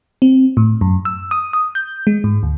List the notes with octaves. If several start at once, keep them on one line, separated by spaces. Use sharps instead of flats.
C4
A2
F#2
E6
D#6
D#6
G6
G#3
G#2
D2